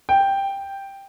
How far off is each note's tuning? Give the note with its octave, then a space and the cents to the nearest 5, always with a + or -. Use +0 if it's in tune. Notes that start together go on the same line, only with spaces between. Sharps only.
G5 +5